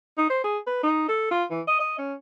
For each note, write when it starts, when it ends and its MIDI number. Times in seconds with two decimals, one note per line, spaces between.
0.18 0.28 63
0.30 0.39 72
0.44 0.58 68
0.67 0.82 71
0.83 1.05 63
1.08 1.31 69
1.31 1.44 65
1.50 1.61 52
1.67 1.79 75
1.80 1.95 75
1.98 2.14 61